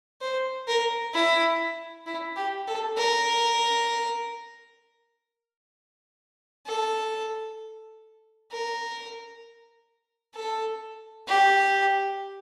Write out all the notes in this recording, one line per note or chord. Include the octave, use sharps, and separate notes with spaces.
C5
A#4
E4
E4
G4
A4
A#4
A4
A#4
A4
G4